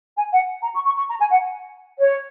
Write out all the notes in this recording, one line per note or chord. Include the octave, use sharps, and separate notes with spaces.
G#5
F#5
A#5
C#6
C#6
C#6
A#5
G#5
F#5
C#5